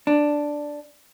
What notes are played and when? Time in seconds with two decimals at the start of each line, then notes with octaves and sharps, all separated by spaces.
0.07 D4